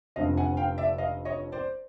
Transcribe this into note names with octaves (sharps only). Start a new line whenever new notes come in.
F1 F2 D3 F3 D#5 F5
F#5 G#5
F5 G5
D5 E5
D#5 F5
C#5 D#5
C5 D5